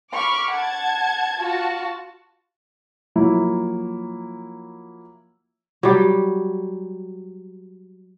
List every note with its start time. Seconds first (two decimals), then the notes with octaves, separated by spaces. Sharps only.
0.12 B5 C#6 D6 F6
0.50 F#5 A5 G#6
1.39 F4 F#4 A5
3.15 F3 F#3 A#3 E4
5.83 F#3 G3